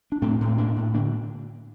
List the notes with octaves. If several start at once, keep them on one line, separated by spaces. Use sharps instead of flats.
D4
A2 A3 C4
A2
C4
A2 A#3 D4
A2
D3 A#3 D4